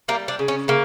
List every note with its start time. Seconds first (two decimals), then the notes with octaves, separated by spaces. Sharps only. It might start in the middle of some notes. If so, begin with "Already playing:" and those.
0.08 G3 A#3
0.28 D4
0.39 C#3
0.48 C#4
0.68 C#3 A#3